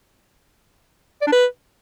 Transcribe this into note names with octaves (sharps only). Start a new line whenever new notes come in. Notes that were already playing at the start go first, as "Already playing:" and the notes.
D5
D4
B4